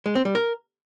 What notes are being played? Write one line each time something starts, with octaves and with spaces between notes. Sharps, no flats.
G#3
C4
G3
A#4